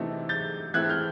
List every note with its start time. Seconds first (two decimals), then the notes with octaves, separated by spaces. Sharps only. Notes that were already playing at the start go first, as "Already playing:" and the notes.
Already playing: C3 E3 A3 C4 D#4
0.29 G6 A6
0.74 E3 A3 C4 E4 F#6 G#6
0.89 F6 G6